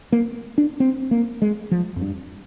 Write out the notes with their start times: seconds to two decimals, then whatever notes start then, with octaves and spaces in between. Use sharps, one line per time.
0.12 A#3
0.58 D4
0.80 C4
1.11 A#3
1.42 G#3
1.71 F3
1.96 F2
2.01 G2